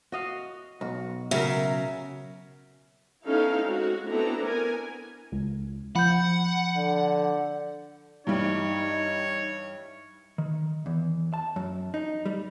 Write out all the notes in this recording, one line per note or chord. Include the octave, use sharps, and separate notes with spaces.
F#4 D#5 F5
B1 F#4
C#3 F#3 A#4 E5
B3 C#4 D#4 E4 A4 F5
G#3 C4 F#4
B3 C4 D4 E4 A4 A#5
B3 A#4 G#5
C#2
F3 F#5 B5 G6
D3
G2 E3 G3 D#4 C#5
D#3
E2
A5
F#2
D#4
G3